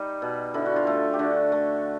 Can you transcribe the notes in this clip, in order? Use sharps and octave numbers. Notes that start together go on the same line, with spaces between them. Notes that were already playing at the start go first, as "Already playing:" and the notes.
Already playing: G3 D#4
B2
D3 E4
F#4
F4
A3
G4
D3 F#4
A3